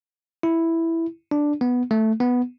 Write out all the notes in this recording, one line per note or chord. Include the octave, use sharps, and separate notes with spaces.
E4
D4
B3
A3
B3